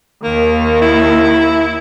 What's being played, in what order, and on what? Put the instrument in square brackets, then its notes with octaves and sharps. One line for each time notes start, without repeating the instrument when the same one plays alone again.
[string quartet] D#2 D#3 [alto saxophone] A#3
[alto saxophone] E4